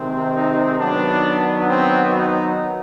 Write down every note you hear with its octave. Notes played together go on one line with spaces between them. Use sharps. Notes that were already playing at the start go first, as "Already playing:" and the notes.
Already playing: C3 D#3 G#3 C4
D#4
D#3 F#3 B3 D4
C4
D#4